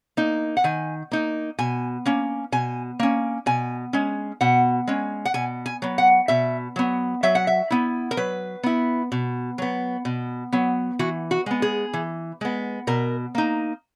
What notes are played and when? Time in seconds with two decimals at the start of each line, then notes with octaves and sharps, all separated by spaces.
0.17 A#3 D#4
0.57 F#5
0.64 D#3 G#5
1.11 A#3 D#4
1.59 B2 G#5
2.06 A#3 C#4
2.52 B2 G#5
2.99 A#3 C#4
3.46 B2 G#5
3.93 G#3 C#4
4.41 B2 F#5
4.87 G#3 C#4
5.25 F#5
5.34 B2 G#5
5.66 G#5
5.82 F#3 B3
5.98 F#5
6.28 B2 E5
6.76 F#3 B3
7.23 F#3 E5
7.35 F#5
7.47 E5
7.70 B3 E4
8.11 A#4
8.17 F#3 B4
8.63 B3 E4
9.12 B2
9.58 F#3 B3
10.05 B2
10.52 F#3 B3
10.99 E3 F#4
11.31 F#4
11.46 G#3 B3
11.62 G#4
11.93 E3
12.41 G#3 B3
12.87 B2 A#4
13.35 A#3 D#4